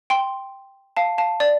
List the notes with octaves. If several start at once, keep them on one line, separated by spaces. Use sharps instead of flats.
G5 C6
F5 A5
F5 A5
D5